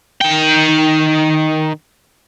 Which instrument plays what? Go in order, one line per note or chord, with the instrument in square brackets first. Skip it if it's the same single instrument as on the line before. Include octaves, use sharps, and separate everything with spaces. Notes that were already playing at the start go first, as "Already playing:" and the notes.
[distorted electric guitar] D#3 G5